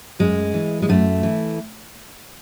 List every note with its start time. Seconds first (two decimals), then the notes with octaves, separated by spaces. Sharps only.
0.19 F#2 G#3
0.54 E3
0.82 G#3
0.89 F#2 A3
1.23 E3